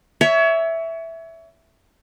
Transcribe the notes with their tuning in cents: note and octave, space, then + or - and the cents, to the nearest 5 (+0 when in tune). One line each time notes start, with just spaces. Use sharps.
C#5 +30 E5 +0